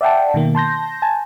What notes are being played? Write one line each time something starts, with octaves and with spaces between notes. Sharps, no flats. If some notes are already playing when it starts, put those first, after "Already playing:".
D5 E5 F#5 G5 A5
B2 D#3 A#3
A5 C6 G6 A#6
G#5 A5